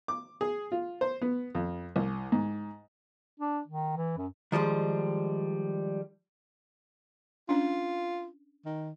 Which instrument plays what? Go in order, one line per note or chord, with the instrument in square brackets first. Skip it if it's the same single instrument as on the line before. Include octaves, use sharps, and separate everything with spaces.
[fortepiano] D6
G#4
F4
C5
B3
F2
C2
G#2
[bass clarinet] D4
D#3
E3
F#2
[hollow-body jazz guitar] D#3 F3 G3 G#3
[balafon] C#4 D4 [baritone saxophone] F4
[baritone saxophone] D#3